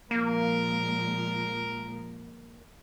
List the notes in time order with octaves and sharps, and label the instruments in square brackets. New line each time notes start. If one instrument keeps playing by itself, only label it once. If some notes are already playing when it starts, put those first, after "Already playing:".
[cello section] A#2 F3 G#3 [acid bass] A#3 [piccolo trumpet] A#4